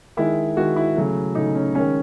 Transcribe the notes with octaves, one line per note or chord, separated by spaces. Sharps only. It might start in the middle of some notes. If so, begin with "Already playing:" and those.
D#3 G#3 E4
D#3 G#3 F#4
E4
C#3 F#3 A3
C#3 F#3 A3 D#4
C#4
D#3 G#3 C#4